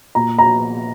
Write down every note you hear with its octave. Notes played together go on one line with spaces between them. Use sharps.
A#2 A#5
A#5